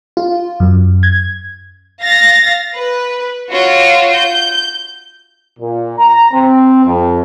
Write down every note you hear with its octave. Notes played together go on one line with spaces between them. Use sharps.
F4
F#2
G#6
F5 A6 A#6
B4
F4 F#4 C#5
G6
A#2
A#5
C4
F2